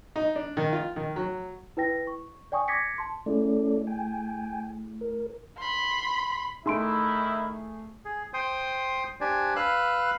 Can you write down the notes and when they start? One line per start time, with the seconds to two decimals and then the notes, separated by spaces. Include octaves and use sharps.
0.16 D#4
0.36 D4
0.57 D#3
0.73 F4
0.96 D#3
1.16 F#3
1.77 E4 B4 G5 A#6
2.07 C#6
2.52 D5 G5 G#5 C#6 D#6
2.68 D6 G#6 A#6 B6 C#7
2.98 A5 C6
3.26 A3 C#4 E4 G#4 A4 D5
3.87 G5 G#5
5.01 A#4
5.58 B5 C6
6.66 D#3 A3 D#4 E4 G#4 C6 D7
8.05 G#4
8.34 C5 G5 C6 D#6
9.21 D4 G4 C5 D5 G#5
9.56 B4 F5 E6 F#6